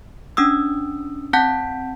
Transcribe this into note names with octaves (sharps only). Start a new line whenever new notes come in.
C#4 D4 D#6 E6
C4 F#5 A5 G6 B6